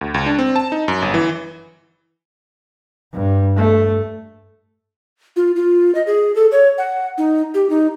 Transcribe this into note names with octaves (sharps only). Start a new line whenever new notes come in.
D2
C#2
D4
C4
A5
D#4
F#2
G1
E3
G2
A3
F4
F4
D#5
G#4
A4
C#5
F#5
D#4
G4
D#4